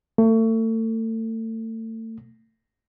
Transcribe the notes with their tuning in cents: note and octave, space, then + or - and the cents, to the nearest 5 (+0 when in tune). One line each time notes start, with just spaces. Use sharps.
A3 +35